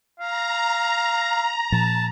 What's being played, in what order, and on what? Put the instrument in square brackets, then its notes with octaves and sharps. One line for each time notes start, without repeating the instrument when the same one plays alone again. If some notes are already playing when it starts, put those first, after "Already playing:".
[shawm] F5 [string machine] A#5
[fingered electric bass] A#2 F3 [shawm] A5